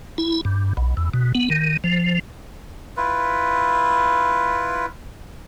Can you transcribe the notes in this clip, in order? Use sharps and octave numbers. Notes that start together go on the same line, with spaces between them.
E4
G2
B1
E2
B2
B3
D#3
F3
E4 F4 B4